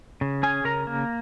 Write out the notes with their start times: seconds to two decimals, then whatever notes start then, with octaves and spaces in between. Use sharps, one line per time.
0.21 C#3
0.43 C#4 G#4 G#5
0.65 C#3 A#4 A#5
0.87 A#3